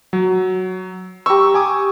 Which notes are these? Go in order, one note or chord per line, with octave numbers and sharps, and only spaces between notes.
F#3
G4 A#5 C#6 E6
G#5 D6 D#6